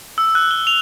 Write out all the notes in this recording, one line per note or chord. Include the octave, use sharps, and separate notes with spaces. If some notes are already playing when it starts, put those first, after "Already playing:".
E6
F#6
G7
F7